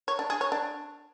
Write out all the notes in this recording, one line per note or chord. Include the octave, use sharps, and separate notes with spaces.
C#5
D4
G#4
C#5
D4